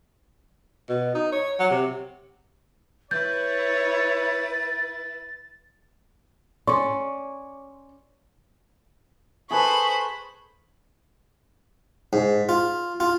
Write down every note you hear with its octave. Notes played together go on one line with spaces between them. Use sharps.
B2
D#4
C#5
F#3
C3
E4 B4 C#5 G6 A6
C#4 D5 C6 C#6
G#4 A4 B4 C5 B5 C#6
G#2
F4
F4